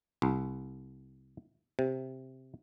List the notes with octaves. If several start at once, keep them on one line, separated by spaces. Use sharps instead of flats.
C2
C3